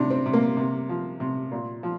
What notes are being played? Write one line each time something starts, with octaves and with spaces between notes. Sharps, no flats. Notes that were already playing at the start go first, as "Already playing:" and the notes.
Already playing: C3 D#3 D4
C4
C3
A#3
C3
F3
C3
A#2
F3